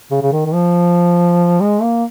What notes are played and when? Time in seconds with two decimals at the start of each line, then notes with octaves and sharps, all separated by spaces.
0.11 C#3
0.22 C#3
0.32 D#3
0.46 D#3
0.54 F3
1.60 G#3
1.82 A#3